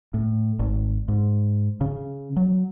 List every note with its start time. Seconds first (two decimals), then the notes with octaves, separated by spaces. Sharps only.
0.14 A2
0.59 G#1
1.08 G#2
1.81 C#3
2.37 F#3